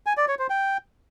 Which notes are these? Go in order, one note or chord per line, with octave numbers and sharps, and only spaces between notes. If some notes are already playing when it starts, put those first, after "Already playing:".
G#5
D5
C#5
C5
G5